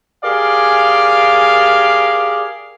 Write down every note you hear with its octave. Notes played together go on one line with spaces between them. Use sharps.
G4 G#4 A#4 D5 F5